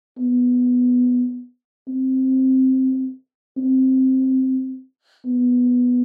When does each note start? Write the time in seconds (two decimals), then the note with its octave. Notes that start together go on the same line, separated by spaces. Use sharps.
0.19 B3
1.88 C4
3.57 C4
5.26 B3